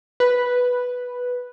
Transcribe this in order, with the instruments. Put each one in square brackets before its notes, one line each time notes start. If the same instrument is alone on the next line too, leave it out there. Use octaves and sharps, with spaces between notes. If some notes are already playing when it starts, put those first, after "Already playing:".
[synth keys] B4